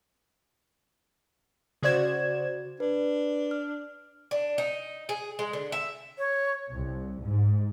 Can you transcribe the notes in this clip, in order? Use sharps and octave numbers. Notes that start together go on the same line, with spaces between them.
C#3 F#4 C5 D5 G#6 E7
D4 B4
F6
D4
D#4
G#4
G#3
D3
E5
C#5
C2
G#2